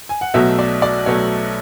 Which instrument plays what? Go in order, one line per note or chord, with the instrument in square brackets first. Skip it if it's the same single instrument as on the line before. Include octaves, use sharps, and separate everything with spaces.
[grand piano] G#5
F#5
B1 B2 F#3 A3 E5
D5
D5
B1 B2 F#3 A3 C#5